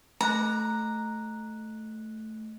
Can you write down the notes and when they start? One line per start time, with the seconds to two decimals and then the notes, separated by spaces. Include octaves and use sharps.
0.21 A3 A#5 F#6